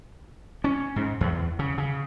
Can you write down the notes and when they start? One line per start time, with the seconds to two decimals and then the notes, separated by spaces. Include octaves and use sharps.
0.64 C#4
0.96 G#2
1.21 E2
1.59 C#3
1.78 C#3